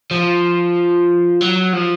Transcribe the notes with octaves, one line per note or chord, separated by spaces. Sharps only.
F3
F#3
F3